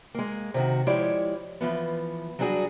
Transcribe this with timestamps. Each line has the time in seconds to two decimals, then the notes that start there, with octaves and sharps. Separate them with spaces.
0.14 G#3 A#3
0.54 C3 D#3 F#4
0.87 F3 G#3 E4 G4 C#5 D5
1.61 E3 F3 B3
2.39 F#3 G3 D4 F#4 G#4